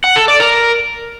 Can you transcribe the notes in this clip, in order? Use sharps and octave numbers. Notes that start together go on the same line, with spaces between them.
F#5
A4
D5
A#4